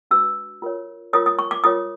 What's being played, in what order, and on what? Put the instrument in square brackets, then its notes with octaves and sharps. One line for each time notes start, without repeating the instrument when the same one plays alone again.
[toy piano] D4 F#4 B4 E6
F4 A#4 C#5
F4 A#4 C#5 D#6
D#6
C#6
D6
F4 A#4 C#5 D#6